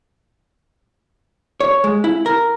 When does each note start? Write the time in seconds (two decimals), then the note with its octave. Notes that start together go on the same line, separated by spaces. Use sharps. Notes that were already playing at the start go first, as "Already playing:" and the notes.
1.61 C#5
1.84 G#3
2.04 E4
2.26 A#4